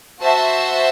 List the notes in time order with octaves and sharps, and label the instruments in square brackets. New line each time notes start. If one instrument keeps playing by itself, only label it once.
[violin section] F#4 C5 E5 A5